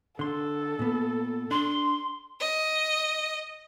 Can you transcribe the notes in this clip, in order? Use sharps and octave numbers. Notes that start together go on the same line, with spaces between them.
D3 A4 C6
A#2 B3
D4 C6
D#5